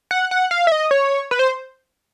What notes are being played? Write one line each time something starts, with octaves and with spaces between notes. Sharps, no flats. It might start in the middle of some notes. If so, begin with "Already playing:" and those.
F#5
F#5
F5
E5
D#5
C#5
B4
C5